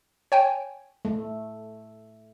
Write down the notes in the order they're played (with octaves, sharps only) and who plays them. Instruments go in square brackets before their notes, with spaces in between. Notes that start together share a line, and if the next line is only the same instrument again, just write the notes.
[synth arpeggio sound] C#5 G5 G#5
[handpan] A3